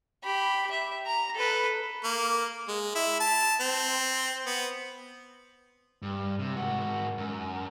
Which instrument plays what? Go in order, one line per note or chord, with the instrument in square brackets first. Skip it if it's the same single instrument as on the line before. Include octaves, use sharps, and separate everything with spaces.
[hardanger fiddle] G4 B5
E5
A#5
A4 B4
[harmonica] A#3
G#3
E4
A5
C4
B3
[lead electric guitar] G2
C3
G#2 F#4
F#2